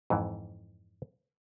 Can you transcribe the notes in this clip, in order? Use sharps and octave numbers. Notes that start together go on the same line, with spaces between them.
F2 G#2 E3